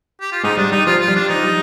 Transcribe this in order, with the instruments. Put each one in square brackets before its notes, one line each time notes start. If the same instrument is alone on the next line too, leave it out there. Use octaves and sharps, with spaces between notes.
[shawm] G4
F4
[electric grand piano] G#2 G#3 [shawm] D#4
[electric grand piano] G3 [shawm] D4
[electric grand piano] G3 [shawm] D#4
[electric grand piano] F3 [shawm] F4
[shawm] F4
[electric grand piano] G3
[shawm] D4
[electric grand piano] F3 [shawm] D#4
[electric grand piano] G3